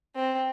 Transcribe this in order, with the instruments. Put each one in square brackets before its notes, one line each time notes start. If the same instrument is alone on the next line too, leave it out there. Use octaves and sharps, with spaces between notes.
[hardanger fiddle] C4